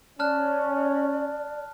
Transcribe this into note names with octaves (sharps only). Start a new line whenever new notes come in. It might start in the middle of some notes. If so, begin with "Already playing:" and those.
C#4 D5 A5 F6 F#6